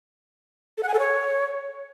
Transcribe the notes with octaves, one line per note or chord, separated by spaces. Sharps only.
A4
F#5
G#5
A4
C#5